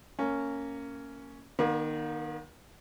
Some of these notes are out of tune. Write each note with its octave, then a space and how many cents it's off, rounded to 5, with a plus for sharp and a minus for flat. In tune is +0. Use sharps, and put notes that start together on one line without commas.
A#3 -15 C#4 +0
D#3 -15 A#3 +45